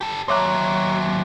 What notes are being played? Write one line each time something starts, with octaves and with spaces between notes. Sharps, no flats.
G4 A4
D#2 F#3 C#5 E5 A#5 C6 D6 F#6